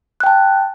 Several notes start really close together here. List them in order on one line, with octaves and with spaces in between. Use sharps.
F#6 G5 A5